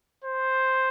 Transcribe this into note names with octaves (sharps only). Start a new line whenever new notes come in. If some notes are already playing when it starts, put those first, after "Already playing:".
C5